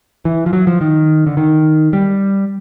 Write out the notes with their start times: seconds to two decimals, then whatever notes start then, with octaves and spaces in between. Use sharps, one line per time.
0.25 E3
0.46 F3
0.53 F#3
0.67 F3
0.81 D#3
1.27 D3
1.37 D#3
1.93 G3